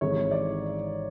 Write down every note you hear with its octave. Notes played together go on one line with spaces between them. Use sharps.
G#1 G#2 E3 C#5
D5